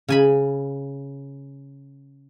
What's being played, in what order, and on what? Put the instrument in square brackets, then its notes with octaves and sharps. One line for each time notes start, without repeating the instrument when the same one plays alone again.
[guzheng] C#3 G#5 B5